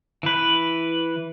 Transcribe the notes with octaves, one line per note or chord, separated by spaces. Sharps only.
E3 B4